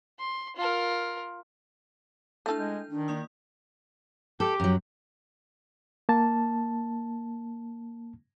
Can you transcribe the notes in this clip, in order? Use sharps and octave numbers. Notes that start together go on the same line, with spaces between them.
C6
F4 A#4
A3 D4 E4 A4 G6
G#3
D#3 D4
A#3 D5 D#6
G4 A4
F#2 F#3
A#3 A5